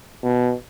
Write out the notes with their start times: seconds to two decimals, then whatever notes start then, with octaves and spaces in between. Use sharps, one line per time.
0.23 B2